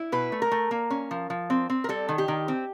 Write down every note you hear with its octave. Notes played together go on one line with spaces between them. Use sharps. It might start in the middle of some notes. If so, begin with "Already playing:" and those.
Already playing: E4
B2 B4
A3
A#4
A3
A#3
C#4
F3
F3
C4
C4
A#4
G3 A4
D#3
G4
D#3
C4